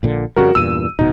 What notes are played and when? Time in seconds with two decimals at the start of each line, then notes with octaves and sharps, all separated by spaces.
0.03 A#1 A#2 D3
0.36 F2 C#3 G3 F#4 A#4
0.55 E2 G2 A#2 E6 D#7
0.99 D1 B2 D#4